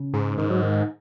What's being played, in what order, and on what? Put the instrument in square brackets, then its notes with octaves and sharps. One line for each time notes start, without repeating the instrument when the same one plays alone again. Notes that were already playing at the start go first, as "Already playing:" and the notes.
Already playing: [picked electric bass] C#3
[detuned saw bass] G#2
[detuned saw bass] G#2 [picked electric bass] D#3
[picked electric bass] F#3
D#3